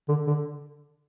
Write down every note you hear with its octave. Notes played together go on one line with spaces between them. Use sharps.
D3
D3